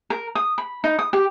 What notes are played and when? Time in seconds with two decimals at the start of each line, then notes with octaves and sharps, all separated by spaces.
0.10 A#4
0.35 D#6
0.58 B5
0.84 D#4
0.99 D#6
1.13 G4